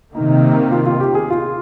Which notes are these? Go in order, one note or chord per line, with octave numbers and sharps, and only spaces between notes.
C3 D#3 A#3 D#4
F4
F4
G4
G#4
F4